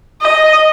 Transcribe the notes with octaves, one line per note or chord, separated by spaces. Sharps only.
D#5